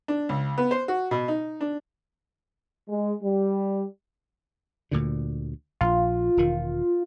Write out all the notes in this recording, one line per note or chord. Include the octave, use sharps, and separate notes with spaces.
D4
C#2
B3
C5
F#4
B2
D#4
D4
G#3
G3
D2 A#2 D3
A#1 F4
E1 D#3